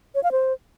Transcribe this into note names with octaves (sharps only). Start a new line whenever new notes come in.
C#5
F5
C5